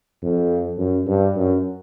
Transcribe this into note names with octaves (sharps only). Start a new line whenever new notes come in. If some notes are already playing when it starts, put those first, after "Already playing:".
F2
F#2
G2
F#2